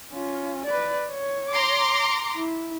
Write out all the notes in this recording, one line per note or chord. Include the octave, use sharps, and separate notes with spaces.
C#4 F4
B4 D5
C#5
A#5 C6 D6
E4